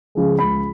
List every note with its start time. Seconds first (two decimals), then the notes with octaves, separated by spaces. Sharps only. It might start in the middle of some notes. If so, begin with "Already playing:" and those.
0.15 C#3 F3 G#3
0.39 C#2 B5